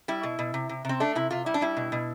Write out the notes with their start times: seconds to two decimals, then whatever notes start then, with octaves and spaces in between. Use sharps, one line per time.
0.08 G3 E4
0.23 B2
0.39 B2
0.54 C3
0.69 C3
0.85 C3 C4
1.00 A3 D4
1.15 C3 E4
1.31 C3 F4
1.46 G3 E4
1.54 D4
1.61 G3 E4
1.77 B2
1.92 B2